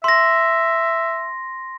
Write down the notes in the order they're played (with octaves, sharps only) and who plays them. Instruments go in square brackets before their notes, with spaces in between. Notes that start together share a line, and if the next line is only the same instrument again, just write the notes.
[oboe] E5 [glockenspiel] C6 A#6